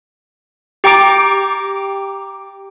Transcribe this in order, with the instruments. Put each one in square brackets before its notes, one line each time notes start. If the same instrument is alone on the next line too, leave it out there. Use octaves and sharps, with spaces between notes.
[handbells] G4 G5 A#5 D6 D7